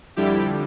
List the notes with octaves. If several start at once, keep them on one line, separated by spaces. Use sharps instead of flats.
F2 D3 G3 E4 G4